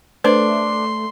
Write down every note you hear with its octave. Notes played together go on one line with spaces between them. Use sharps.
A3 D4 B4 C5 C6